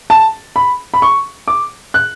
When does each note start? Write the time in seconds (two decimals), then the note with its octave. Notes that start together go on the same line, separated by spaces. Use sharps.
0.10 A5
0.56 B5
0.94 B5
1.02 C#6
1.48 D6
1.94 F#6